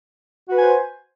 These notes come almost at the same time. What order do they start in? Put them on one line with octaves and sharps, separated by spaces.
F#4 B4 G#5 C5